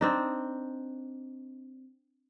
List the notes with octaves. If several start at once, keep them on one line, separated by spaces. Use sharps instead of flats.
C4 D4 D#4